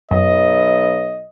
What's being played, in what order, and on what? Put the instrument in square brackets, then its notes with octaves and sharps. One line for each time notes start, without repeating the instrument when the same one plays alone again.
[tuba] B1 [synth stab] F#2 [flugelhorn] D#5